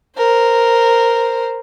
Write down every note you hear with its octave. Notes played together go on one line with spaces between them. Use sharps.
A#4 C5